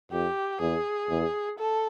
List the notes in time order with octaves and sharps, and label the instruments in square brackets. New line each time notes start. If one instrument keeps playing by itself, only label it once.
[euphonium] F2 [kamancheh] G4
[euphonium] E2 [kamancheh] G#4
[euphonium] E2
[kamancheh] A4